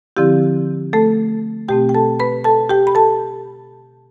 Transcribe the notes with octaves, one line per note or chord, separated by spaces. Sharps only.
D3 F3 C4 E4 G4
A3 A4
B2 A3 C4 G4 G5
G5
A4 A5
B4 B5
A4 A5
G4 G5
B5
A4 A5